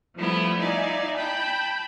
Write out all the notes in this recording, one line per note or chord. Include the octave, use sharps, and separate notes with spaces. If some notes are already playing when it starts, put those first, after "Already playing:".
F3 G3 A3 B3 E4
D#4 E4 D5 F5 G#5
G5 A5 B5 G6